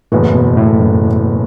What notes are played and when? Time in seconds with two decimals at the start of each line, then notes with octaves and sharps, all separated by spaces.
0.12 F#1 E2 A2 E3 B3 F#4
0.35 B2
0.57 A2
0.80 F#2